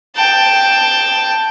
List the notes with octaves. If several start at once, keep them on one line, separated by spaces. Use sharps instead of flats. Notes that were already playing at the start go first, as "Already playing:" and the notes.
G5 A5